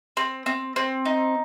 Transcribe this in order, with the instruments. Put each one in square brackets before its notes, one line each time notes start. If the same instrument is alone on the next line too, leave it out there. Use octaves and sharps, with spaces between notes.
[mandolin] C4
C4
C4
D#4